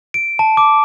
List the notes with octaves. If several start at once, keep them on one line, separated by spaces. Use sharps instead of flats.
D7
A5
D6